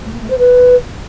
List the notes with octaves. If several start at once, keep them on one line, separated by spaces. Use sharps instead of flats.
A3
A#3
A3
C5
B4